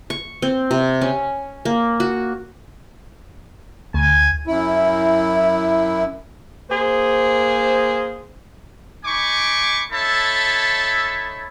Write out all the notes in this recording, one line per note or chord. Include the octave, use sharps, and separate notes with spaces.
C#6
C4
C3
C#4
A#3
F#4
D2 G#5
F#2 E4
A#3 G#4 C5
D#4 G#5 B5 C#6 D6
D#4 A4 C#5 E5 A5 B5